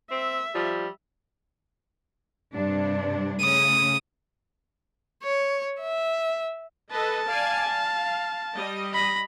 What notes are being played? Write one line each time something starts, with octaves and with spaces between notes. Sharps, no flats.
C4 E5
F3 G3
G2 C3 D4
C#3 A3 D#6
C#5
E5
A4 B4 D#5 A5
D5 F5 G#5
F5
G3 D#5
B5 A#6